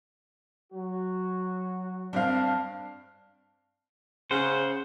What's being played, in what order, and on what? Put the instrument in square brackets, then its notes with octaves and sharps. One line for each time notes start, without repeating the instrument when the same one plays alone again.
[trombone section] F#3 F#4
[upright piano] G2 C4 F5 [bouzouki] D4
[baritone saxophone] C#3 [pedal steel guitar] C5 F#5